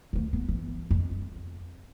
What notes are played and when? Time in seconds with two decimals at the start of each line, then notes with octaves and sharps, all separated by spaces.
0.13 D2 A3
0.33 B3
0.49 E3
0.91 F2